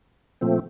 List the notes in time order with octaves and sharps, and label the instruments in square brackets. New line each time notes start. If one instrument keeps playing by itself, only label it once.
[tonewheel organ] A#2 F3 A3 C4